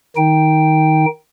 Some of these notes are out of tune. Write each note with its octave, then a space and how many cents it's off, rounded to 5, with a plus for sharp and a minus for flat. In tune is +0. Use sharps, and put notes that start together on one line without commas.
D#3 +0 D#4 +20 G5 +0